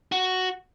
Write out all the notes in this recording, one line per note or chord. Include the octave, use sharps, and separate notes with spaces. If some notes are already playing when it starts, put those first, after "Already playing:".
F#4